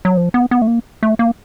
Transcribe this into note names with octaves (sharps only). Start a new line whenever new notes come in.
F#3
F3
B3
B3
A3
A#3
A3
A#3